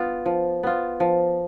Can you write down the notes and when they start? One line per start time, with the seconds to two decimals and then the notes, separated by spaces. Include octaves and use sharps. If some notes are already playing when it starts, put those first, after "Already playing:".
Already playing: B3 F4
0.26 F3
0.63 B3 F4
1.00 F3